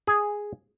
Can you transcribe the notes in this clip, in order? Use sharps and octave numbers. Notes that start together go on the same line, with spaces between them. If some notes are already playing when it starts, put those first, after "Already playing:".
G#4